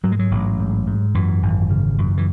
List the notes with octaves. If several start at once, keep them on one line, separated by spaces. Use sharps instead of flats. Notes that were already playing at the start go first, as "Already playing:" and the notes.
G#2 F#3
G#3
F#3
A1
G#2
G#2
F#2 E3
G#1
C#3
F#2
E3